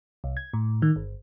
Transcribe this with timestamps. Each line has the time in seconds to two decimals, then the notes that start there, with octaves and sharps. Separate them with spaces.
0.24 C2
0.37 G#6
0.53 A2
0.82 D#3
0.96 G1